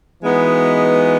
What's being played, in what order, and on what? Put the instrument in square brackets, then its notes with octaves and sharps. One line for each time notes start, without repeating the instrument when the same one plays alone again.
[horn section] E3 G#3 B3 D#4 F#4